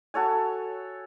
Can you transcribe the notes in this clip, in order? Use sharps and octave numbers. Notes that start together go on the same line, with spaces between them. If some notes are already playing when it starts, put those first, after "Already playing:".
F#4 A4 C#5 G#5